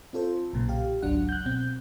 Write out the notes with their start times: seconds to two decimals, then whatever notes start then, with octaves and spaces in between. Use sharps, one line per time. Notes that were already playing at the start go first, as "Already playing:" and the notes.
0.13 C4 F4 A4 C5
0.53 B1 A#2 C#3
0.69 G4 F5
1.02 G#1 C#2 F#3 D4 F#5
1.29 F#6 G6
1.46 B2 C4 G6